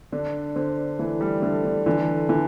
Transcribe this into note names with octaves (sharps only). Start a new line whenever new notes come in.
D3 D4
D3 C5
E3 A3
G3
D3 A3
D3
D3 E3
D3 E3